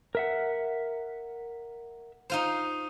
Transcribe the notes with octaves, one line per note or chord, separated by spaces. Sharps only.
A#4 E5 F#5
D#4 F4 C5